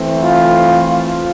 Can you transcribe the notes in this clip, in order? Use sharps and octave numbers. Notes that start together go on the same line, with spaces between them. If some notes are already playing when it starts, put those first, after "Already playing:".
Already playing: E3 A3 C4
F4
F4